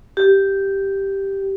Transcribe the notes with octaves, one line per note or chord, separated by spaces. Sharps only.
G4